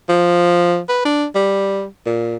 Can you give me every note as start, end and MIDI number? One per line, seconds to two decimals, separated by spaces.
0.09 0.80 53
0.89 1.01 71
1.05 1.26 62
1.35 1.85 55
2.06 2.36 46